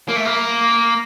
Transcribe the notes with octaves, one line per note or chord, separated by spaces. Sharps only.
A#3
A3
A#3